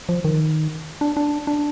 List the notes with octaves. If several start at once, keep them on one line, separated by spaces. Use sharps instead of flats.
F3
D#3
D4
D4
D4